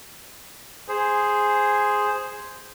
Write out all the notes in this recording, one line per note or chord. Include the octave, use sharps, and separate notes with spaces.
G#4 C5